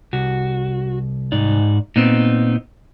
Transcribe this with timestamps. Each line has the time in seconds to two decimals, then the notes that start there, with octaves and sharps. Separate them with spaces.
0.13 C2 F#4
1.32 G#2 D#4 D5
1.96 A#2 B3 C4 D#4